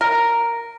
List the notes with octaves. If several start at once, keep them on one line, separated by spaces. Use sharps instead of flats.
A#4